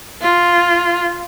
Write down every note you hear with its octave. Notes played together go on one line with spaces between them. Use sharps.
F4